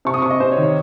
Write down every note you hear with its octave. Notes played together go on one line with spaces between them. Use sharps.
C3 C#6
D#6
C3 C#6
D#5
C3 C5
C#5
D#3
C#5